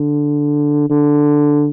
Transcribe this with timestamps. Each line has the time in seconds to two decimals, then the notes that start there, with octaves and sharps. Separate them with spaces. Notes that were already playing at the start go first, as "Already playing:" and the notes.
Already playing: D3
0.90 D3